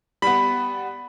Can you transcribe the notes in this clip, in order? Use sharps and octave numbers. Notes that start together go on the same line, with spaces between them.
G3 B3 B5